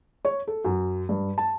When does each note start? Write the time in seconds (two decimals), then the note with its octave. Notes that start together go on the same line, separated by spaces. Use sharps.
0.25 C#5
0.48 A4
0.65 F#2
1.09 G2
1.38 A5